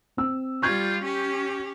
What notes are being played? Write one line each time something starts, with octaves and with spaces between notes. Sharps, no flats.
C4 E6
G3 F4 C#6 G6 G#6
C#4 G4